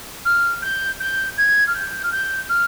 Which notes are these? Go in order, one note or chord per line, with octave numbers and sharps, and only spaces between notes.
F6
G6
G6
G#6
F6
G6
F6
G6
F6